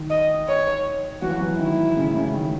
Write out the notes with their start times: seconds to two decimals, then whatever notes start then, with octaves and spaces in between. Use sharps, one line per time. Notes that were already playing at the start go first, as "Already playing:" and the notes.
Already playing: D#3
0.10 D#5
0.48 C#5
1.22 E3 F#4
1.31 F#3
1.40 E3
1.59 D#3 E4
1.97 C#3
2.15 C#3
2.33 D#3